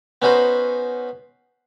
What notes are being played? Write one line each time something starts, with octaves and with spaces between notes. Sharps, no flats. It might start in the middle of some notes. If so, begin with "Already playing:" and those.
B3 C#4 D#4 F#4 B4 C5